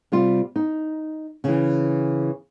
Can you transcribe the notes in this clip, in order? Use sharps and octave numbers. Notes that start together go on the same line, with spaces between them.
C3 G3 F4
D#4
C#3 E3